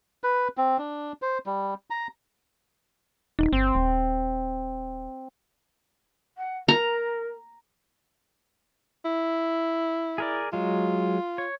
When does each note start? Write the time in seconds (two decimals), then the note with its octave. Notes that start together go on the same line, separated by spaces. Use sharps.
0.24 B4
0.57 C4
0.78 D4
1.22 C5
1.46 G3
1.90 A#5
3.39 D#1 D#4
3.53 G1 C4
3.75 D#1
6.38 F#5
6.68 A#4 A#5
9.05 E4
10.18 G#4 A#4 D5
10.53 F#3 G#3 F4
11.38 C#5